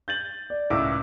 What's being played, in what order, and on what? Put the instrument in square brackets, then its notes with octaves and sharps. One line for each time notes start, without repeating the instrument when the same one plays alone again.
[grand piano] G6 A6 F#7
D5
[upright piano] C#2 A2 [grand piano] D6 E6